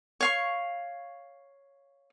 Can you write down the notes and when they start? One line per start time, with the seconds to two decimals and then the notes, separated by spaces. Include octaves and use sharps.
0.20 C#5 F5 C#6